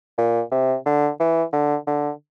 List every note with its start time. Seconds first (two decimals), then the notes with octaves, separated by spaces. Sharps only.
0.18 A#2
0.51 C3
0.86 D3
1.20 E3
1.53 D3
1.87 D3